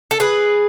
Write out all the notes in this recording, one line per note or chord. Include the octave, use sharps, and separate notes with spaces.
A4
G#4 B4